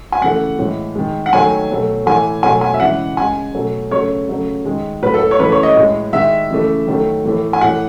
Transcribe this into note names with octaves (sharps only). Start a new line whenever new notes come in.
G#5
C#3 E3 A3 F#5
A2 E3 G#3
D#3 G#3
F#5
D#3 F#3 A3 G#5
B2 F#3 A3
A2 E3 A3 G#5
B2 F#3 A3 G#5
G#5
E5
C#3 E3 G#3 F#5
C#3 G#3 G#5
B2 F#3 A3
C#3 F#3 A3 C#5
C#3 F#3 A3
D#3 G#3
A2 F#3 A3 B4
A4
C#5
C#3 E3 A3 B4
C#5
D#5
A2 G#3
D#3 G#3 E5
C#3 E3 A3
D#3 F#3 A3
A2 E3 A3
G#5
A2 E3 A3 F#5